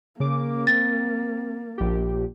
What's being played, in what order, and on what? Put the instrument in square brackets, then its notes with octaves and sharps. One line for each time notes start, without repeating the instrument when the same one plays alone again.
[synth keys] C#3 D6 [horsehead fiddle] A#3
[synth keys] C4 [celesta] A6
[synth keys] A#1 G4